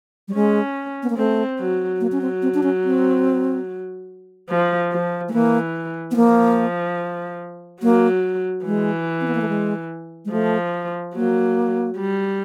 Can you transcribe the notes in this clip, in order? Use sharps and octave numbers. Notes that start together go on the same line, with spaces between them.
G3
G#3 C#4
B3
A#3
A3 C4
F#3
F#3 A#3
C#4
C4
C4
D4
C#4
C4
F3
F3
A3
E3 A#3
B3
F3 A#3
F#3 A#3
E3 G#3
C4
B3
A#3
A3
G#3
G#3
F3 A3
F#3 A#3
G3